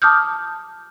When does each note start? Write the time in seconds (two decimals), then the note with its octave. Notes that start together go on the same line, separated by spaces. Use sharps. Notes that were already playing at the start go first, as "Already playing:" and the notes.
0.02 A5 D6 D#6 F6 G6